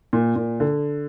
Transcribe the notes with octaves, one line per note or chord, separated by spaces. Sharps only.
A#2
A#2
D3